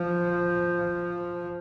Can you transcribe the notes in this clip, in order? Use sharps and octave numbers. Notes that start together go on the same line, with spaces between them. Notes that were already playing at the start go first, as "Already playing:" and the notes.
Already playing: F3